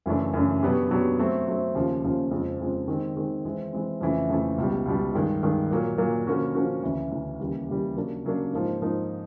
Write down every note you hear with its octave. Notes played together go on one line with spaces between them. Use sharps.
F#2 C#3 E3 A3 D4
F#2 C#3 E3 A3 D4
B2 F#3 B3 D4 G4
B2 F#3 B3 D4 G4
F#3 A3 C4
F#3 A3 C4
D#2 C#3 F3
D#2 C#3 F3
F2 C#3 F3 G#3 C4
F2 C#3 F3 G#3 C4
D#3 G#3 C4
D#3 G#3 C4
E3 G#3 C4
E3 G#3 C4
F2 C#3 E3 A3
F2 C#3 E3 A3
C#2 B2 G3
C#2 B2 G3
G2 D#3 G#3
G2 D#3 G#3
A#2 F#3 A#3
A#2 F#3 A#3
D3 F3 A#3 C#4 F#4
D3 F3 A#3 C#4 F#4
D2 C#3 E3
D2 C#3 E3
D#2 C#3 E3 G3
D#2 C#3 E3 G3
C#3 F#3 A#3 D4
C#3 F#3 A#3 D4
G#2 F3 A#3 D#4
G#2 F3 A#3 D#4